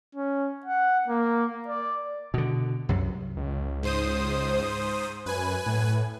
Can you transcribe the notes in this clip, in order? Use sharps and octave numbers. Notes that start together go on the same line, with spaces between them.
C#4
F#5
A#3
D5
B2 D3
C2 F#2
C#2
G#2 C5 D#6
F#2 B4 G#5
A2